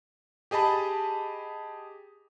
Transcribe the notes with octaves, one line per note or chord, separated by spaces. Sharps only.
G4 G#4 D#5 A5 B5